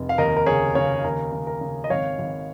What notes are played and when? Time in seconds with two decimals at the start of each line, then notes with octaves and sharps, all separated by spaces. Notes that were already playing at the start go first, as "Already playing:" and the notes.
Already playing: F1
0.09 F5
0.18 D#2 A#4 D#5
0.37 A#4
0.46 C#3 G#4 C#5
0.75 C#3 C#5 F5
1.04 D#2 A#4
1.32 C#3
1.47 A#4
1.61 C#3
1.84 D#5
1.90 G#1 C#5 F5
2.19 G#1